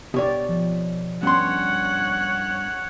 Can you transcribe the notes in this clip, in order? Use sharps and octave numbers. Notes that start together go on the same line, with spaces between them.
B2 G4 C#5 D5
F3
G2 B3 C#4 C#5 F#5 C6